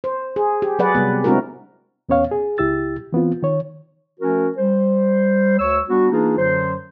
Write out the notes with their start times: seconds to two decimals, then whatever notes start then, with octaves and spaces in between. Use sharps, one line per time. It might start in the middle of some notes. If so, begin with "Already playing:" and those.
0.04 C5
0.36 G#4
0.62 G4
0.79 F#3 G#4 B4 D5 F#5
0.95 C3 G3 B3
1.24 G#3 C4 D4 E4 F#4 A#4
2.09 E2 B3 C#4 C#5 F5
2.31 G#4
2.58 C#2 E4 G4 E6 A6
3.13 E3 B3 C4 F4
3.42 D#3 C#5
4.20 F3 A3 C#4 F#4 A#4
4.58 G3 C5
5.59 D2 C#5 C#6 E6
5.89 G3 B3 D4 F#4
6.12 E3 A#3 D4 D#4 F4 G#4
6.38 F#2 D3 F#3 C5